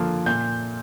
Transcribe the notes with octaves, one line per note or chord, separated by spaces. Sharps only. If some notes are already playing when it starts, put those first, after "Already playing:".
Already playing: D3 F3 A#3
A#2 G6